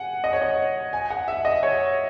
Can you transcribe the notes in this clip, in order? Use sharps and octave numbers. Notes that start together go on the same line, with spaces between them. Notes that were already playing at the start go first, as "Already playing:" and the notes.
Already playing: F#5 G#5
D#5
C#5
D#5
G#5
F#5
E5
D#5
C#5